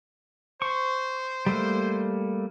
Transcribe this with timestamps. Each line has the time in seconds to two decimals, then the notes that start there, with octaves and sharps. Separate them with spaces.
0.62 C5 C#6
1.46 G3 A3 A#3